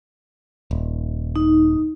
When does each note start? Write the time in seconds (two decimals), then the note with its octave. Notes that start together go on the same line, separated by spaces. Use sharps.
0.71 D#1
1.36 D#4